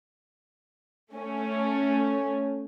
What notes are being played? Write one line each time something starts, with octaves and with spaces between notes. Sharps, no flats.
A3 C#4